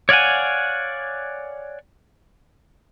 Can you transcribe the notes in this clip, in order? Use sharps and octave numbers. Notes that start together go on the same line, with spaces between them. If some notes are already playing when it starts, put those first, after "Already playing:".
C#5 D5 F5 F#5 G#5